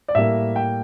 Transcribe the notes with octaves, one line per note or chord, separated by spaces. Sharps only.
D5
A2 G3 A#3 E5
G5